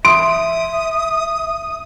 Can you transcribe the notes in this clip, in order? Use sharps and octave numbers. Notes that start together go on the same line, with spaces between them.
E5 C6 D#6 D7